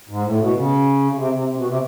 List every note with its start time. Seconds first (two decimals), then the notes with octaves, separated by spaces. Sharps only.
0.09 G#2
0.25 A2
0.40 B2
0.55 C#3
1.11 C#3
1.16 C3
1.32 C3
1.47 C3
1.57 B2
1.68 C3